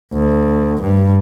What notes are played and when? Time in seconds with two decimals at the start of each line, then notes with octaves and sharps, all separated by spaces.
0.13 D2
0.82 G2